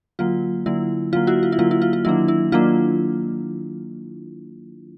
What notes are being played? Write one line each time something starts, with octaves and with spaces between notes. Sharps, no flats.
D3 F#3 A#3 F4
D3 F#3 A#3 E4
D3 F#3 A#3 F4
E4 F#4
F4
E4
D3 F#3 A#3 F4
E4
F4
F4
D#3 F#3 A#3 D4 E4
E4
D#3 F#3 A#3 D4 F4